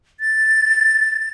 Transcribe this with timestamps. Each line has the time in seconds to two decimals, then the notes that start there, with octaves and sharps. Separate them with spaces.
0.20 A6